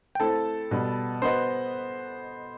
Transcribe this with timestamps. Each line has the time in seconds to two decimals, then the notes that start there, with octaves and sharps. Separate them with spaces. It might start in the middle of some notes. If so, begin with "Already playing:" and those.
0.15 G5
0.20 A3 C4 E4 A4 A5
0.71 B2 G3 B3
1.22 B3 F#4 B4 C5 D#5 C6